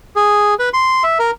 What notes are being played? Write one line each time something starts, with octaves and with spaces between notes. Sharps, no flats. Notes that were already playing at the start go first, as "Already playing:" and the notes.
G#4
B4
C6
E5
A#4